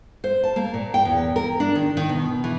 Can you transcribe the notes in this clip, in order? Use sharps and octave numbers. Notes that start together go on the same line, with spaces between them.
C5
A5
A#3
A#2
G5
E2
A#4
D4
D#3
D#3
B2
E3